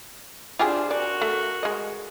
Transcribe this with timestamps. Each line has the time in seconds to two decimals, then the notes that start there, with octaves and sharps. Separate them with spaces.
0.59 D4 F4 G4 G#4 C5
0.91 F#4 A#4 D5
1.22 A3
1.63 G#3 D#5